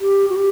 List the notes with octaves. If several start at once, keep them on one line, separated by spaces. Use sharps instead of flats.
G4
F#4
G4